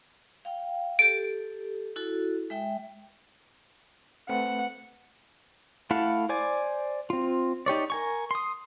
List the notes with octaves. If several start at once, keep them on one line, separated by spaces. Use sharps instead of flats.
F5 G5
G4 A4 D7
E4 F#4 A4
G#3 E5 G5
A3 C4 B4 F#5
A3 E4 A4 F5 F#5
C5 D5 G#5 D6
C4 F4
D#4 G4 C#5 D5
A#4 G#5 C#6
C6 D#6